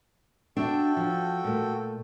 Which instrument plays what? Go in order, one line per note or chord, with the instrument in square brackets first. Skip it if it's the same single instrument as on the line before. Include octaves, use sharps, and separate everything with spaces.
[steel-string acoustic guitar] D4 E5 [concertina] F#4 A4 G5
[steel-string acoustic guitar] F3
A#2 A3